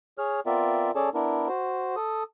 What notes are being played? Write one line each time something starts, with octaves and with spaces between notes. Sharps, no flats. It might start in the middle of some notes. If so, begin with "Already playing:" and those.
G#4 C#5 F6
B3 C4 F4 A#4 D5 E5
C#4 G#4 A4 C#5 D5 A5
B3 D4 E4 A#4
F#4 C5
A4 D#6